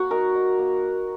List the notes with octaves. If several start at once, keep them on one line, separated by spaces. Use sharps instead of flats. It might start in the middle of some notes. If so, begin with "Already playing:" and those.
Already playing: A#3 F#4
D#4 A#4
D#4
A#3